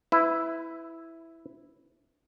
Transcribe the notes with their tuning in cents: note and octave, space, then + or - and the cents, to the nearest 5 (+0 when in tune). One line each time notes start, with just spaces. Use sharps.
E4 +0 B4 +25